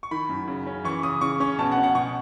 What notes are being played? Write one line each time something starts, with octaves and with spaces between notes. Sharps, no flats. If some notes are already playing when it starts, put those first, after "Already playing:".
C#6
D#3 B5
F#2
C#3
C#4
E3 C#6
C#3 D#6
C#3 C#6
C#4 C#6
B2 A5
F#5
C#4
F#5
B2 C#6